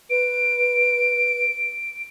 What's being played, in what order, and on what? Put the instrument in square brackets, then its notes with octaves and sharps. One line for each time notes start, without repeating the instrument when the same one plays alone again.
[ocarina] B4 [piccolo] D7